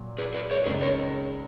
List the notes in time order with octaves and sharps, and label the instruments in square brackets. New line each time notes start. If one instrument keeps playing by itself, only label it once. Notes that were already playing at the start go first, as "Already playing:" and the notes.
Already playing: [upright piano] A#2 F#3
[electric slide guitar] G#4 B4
G#4 B4
A#4 C#5
[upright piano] C#2 C#3 G#3 D#4 [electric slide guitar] G#4 B4
[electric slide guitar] A#4 C#5